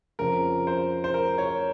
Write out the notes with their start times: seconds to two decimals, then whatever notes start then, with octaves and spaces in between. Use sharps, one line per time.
0.19 F2 C#3 F3 A#4
0.67 C5
1.04 C5
1.14 A#4
1.38 C#5